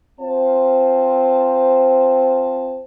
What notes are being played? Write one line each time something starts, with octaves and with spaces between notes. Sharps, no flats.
C4 F4 C5 A5